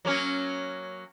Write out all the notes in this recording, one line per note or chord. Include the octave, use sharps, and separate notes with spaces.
F#3 A#3 C#4